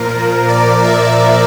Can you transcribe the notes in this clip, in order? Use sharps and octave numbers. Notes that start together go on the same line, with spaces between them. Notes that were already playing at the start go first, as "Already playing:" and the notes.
Already playing: A#2 F3 A#4
D5
E5